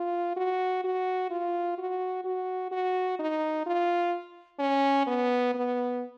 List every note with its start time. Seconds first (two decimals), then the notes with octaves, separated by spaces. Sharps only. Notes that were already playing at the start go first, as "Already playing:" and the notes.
Already playing: F4
0.37 F#4
0.84 F#4
1.31 F4
1.78 F#4
2.25 F#4
2.71 F#4
3.19 D#4
3.66 F4
4.59 C#4
5.07 B3
5.54 B3